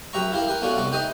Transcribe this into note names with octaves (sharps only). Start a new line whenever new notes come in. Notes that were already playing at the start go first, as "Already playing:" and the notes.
F#2 G4 B4 E5 A#5 C#6
E4 F4 G4 A#4
G4 A#4 B4
A3 B3 C#4 D4 F4 F#4
C2 B3 C#6 D6
D#4 G4 B4 C5 D#5 E5